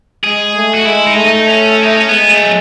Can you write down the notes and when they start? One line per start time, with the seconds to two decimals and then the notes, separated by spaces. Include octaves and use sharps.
0.24 G#3 G#4
0.55 A3
0.74 F#4
0.85 G#3 E4
1.07 D#4
1.16 A3
1.26 D#4
1.47 C#4
1.83 D#4
1.96 C#4
2.09 G#3 B3
2.29 A3
2.42 F#3